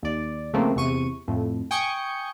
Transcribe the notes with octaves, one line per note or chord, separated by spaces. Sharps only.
D#2 D5
C#3 F3 A3 A#3 C4
E2 C3 C#6 D#7
F2 A2
G5 G#5 C#6 D#6 G6 C#7